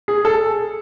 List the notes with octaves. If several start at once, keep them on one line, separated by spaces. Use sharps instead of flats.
G#4
A4